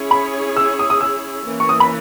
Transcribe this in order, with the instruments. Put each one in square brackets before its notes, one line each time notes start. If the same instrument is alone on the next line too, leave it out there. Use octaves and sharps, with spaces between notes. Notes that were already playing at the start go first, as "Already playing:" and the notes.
Already playing: [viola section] C#4 E4 G#4 C#5
[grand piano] B5
E6
D#6
D#6
E6
[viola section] E3 A#3 C#4
[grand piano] C#6
D#6
B5